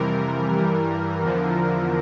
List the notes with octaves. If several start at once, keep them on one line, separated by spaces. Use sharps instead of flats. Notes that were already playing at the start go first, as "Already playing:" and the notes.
Already playing: F2 C3 E3 G3 A#4
G2 E3 G3
E2 D3 F3